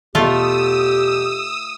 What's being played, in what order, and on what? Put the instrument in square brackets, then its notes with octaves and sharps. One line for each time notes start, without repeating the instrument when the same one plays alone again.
[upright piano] E2 B2 [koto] A3 F4 [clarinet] G4 [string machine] D#6 E6